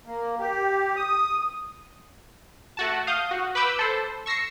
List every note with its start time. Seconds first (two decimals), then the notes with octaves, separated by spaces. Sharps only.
0.06 A#3
0.40 G4
0.96 D#6
2.77 A3 F#4 A5
3.07 F5 D#6 G6
3.31 F#4
3.55 B4 B5 D6 E6 G6
3.79 A4 C5
4.26 C#6 E6 A#6 C7 C#7